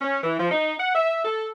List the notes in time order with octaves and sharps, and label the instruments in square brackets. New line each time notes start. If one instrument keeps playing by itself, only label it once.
[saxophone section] C#4
E3
F3
D#4
F#5
E5
A4